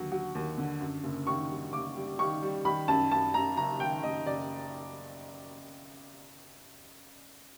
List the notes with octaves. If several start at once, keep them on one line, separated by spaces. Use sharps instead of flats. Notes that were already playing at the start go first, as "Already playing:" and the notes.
Already playing: D#2 D3 F#3
F#3
D#2
D3
F#2
F#1
D#3 C#6
G3
F#1 D6
G3
D#3 C#6
G3
D#3 B5
F#2 A5
F#2 A5
F#2 A#5
F#1 A#5
D#3 G5
F#1 D#5
F#1 D5